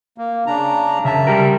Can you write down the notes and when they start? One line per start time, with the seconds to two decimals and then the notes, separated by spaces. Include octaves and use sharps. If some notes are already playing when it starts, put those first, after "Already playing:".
0.18 A#3
0.47 C#3 D4 A#5
1.05 F#2 C#3 E5 A5
1.27 G3 G4 A#4